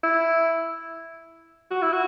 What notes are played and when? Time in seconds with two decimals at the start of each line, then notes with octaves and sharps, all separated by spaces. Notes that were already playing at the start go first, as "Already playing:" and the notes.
0.03 E4
1.71 F#4
1.82 E4
1.92 F#4